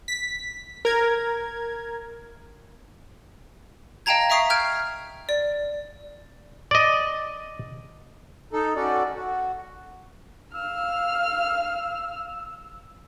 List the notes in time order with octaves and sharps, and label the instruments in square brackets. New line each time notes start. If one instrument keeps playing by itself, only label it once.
[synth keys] B6
A#4 G#6
[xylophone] D#5 F5 G5 A5 A#5 G#6
E5 A#5 C#6 D#6 B6 C7
F6 G6 G#6 D7
D5
[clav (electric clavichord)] D5 D#5
[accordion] D#4 A4
C#4 F#4 A4 D5
F#4
[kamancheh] F5 F6 [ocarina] E6